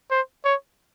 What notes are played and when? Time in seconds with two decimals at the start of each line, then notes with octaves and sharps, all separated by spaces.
0.11 C5
0.45 C#5